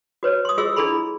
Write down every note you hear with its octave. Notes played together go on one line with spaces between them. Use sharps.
F#4 B4 C#5
C6 D#6
F4 G#4 D#5 C6 E6
D4 E4 G#4 A4 B5 C6